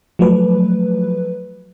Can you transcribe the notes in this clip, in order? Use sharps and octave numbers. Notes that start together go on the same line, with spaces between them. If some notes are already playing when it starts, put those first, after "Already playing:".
F3 F#3 A3 B4